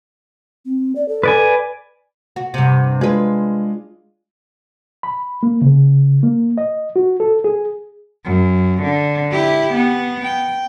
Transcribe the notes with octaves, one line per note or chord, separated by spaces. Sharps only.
C4
D5
A4
B4 D5 G#5
F#4
G2 C3 F#5
G#3 D4 F4 G#4 B4
B5
A#3
C#3
A#3
D#5
F#4
A4
G#4
F#2
D3
E4 G4
B3
G5